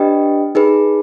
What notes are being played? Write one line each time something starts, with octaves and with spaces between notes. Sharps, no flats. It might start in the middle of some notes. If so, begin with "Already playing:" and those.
Already playing: D4 G4 B4 D#5 G5
D#4 G#4 B4